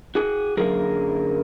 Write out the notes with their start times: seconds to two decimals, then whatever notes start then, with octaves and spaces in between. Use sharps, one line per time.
0.15 F#4 G#4
0.57 F#2 D3 F#3 A#3 G#4 A#4